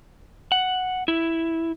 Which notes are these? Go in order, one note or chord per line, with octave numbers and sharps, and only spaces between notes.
F#5
E4